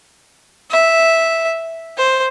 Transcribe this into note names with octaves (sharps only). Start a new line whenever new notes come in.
E5
C5